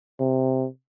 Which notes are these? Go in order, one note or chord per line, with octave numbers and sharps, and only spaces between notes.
C3